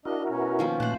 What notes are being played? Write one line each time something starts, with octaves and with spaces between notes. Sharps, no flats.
D4 E4 F#4 A#4 D#5
B2 C#4
D#3 F3 A#3
A#2 A3 C5 F#6